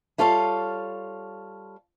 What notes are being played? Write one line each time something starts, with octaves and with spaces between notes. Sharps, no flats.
G3 F4 A4 C#5 F5